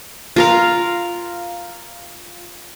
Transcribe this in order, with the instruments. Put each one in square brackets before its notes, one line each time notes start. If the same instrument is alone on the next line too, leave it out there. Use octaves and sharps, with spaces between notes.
[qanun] F4 A#4 F5